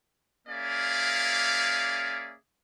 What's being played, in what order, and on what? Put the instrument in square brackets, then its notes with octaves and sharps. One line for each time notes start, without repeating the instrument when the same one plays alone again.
[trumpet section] A#3 C#4 G#4 D5 E5 F5